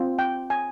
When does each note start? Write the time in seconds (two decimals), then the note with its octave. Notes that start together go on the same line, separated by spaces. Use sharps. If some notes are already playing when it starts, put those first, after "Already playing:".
Already playing: C4 F4
0.19 G5
0.50 G#5